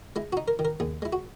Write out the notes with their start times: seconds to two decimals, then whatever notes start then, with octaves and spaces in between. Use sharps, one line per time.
0.16 G#3 E4
0.33 F#4
0.37 D#4
0.48 A#4
0.59 D#3
0.65 A#4
0.80 D#2 G#4
1.02 G#3 E4
1.13 F#4